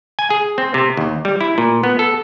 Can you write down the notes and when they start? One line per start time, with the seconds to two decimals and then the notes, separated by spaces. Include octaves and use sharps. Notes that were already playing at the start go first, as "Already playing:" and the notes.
0.19 G#5
0.30 G#4
0.58 C4
0.74 C3
0.97 D#2
1.25 G3
1.41 E4
1.58 A#2
1.83 B3
1.99 A4